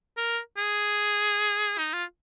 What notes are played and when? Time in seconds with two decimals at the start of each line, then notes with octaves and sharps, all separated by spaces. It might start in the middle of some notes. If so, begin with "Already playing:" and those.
0.17 A#4
0.57 G#4
1.78 D#4
1.93 F4